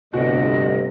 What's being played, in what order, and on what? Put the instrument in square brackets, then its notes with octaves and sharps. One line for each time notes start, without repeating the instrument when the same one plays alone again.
[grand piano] D1 F#4 [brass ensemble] G1 [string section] C3 [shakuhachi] D#5